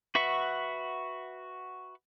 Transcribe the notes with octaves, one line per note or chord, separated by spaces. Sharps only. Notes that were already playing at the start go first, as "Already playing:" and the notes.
F#4 B4 E5 F#5 C#6